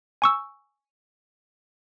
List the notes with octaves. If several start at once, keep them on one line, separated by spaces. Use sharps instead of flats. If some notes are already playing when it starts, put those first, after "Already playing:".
G#5 C#6 E6